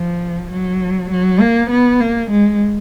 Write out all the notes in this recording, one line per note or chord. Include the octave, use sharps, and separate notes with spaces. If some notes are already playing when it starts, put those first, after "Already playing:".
Already playing: F3
F#3
F#3
A#3
B3
A#3
G#3